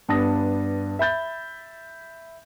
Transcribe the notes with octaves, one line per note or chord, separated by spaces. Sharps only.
G2 B3 D4 A5 D#6 A#6
E5 B5 G6 A6